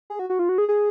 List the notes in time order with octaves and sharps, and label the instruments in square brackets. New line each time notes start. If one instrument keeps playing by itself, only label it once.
[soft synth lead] G#4
F#4
F#4
F4
F#4
G#4
G#4